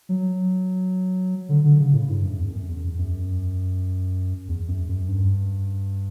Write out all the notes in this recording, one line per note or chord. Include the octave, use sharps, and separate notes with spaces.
F#3
D3
D3
C#3
A2
G2
F#2
E2
F#2
E2
F#2
E2
F#2
F#2
G2